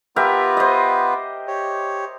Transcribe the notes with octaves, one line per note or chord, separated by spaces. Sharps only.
B3 F4 G4 A#4 B4 E5
C5 D#5
G4 C#5